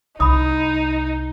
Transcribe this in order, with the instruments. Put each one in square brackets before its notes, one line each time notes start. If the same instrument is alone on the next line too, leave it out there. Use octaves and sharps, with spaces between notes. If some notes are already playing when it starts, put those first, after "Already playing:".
[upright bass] C2 [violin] D#4 [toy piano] B5 D#6